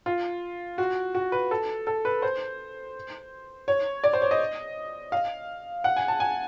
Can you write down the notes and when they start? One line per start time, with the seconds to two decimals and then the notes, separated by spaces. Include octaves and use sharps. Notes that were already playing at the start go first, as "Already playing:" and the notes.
0.06 F4
0.78 F#4
1.15 F#4
1.32 B4
1.51 A4
1.87 A4
2.05 B4
2.22 C5
3.68 C#5
4.04 D5
4.13 C5
4.22 C#5
4.31 D#5
5.12 F5
5.84 F#5
5.96 G#5
6.08 A5
6.20 G#5